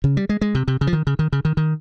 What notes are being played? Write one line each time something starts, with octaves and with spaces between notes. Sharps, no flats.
C#3
G3
G#3
G#3
C3
C3
C#3
F3
D#3
C#3
D#3
C#3
D#3
D#3